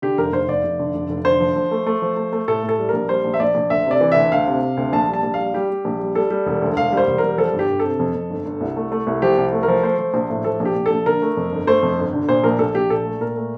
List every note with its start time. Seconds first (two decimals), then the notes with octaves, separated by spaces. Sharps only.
0.02 D3 G4
0.18 F1 A#4
0.33 F1 C5
0.48 F1 D5
0.64 F1
0.79 D3
0.95 F1
1.10 F1
1.25 D3 C5
1.40 F3
1.56 F3
1.71 A3
1.86 A3
2.02 F3
2.17 A3
2.32 A3
2.48 A2 A4
2.63 A2
2.69 A4
2.79 G3
2.89 A#1 A#4
3.09 G3 C5
3.25 A#1
3.34 E5
3.40 A#1 D5
3.55 A#1
3.70 D2 E5
3.86 C3 D5
4.01 E3
4.12 D2 E5
4.32 D2 F5
4.47 C3
4.63 C3
4.77 D2
4.93 A#1 A5
5.09 G3 A5
5.23 A#1
5.34 F5
5.39 G3
5.54 G3 G4
5.70 G3
5.85 A#1
6.00 G3
6.15 G3 A4
6.30 G3
6.46 E1
6.62 D2
6.76 E1 F5
6.92 G3 C5
7.08 E1
7.18 G3 A#4
7.38 F3 A4
7.54 G1
7.59 G4
7.69 G1
7.80 C3 A4
7.99 F2
8.15 F2
8.30 G1
8.45 G1
8.61 C2
8.76 A3
8.92 A3
9.07 C2
9.22 F3 G4
9.38 C2
9.53 A3
9.63 A#4
9.68 F3
9.83 A3 C5
9.99 F3
10.14 A#1 C5
10.30 A2
10.44 F3 A4
10.60 A#1
10.65 G4
10.76 A#1
10.86 A4
10.91 A#1
11.06 D3 A#4
11.22 A3
11.37 F2
11.52 G1
11.67 A3 C5
11.83 F2
11.98 G1
12.13 D3
12.29 A#2 C5
12.44 A#1 A#4
12.59 A#1 A4
12.75 A#1 G4
12.90 A#2 A4
13.06 A3
13.21 A#2 A#4
13.36 A3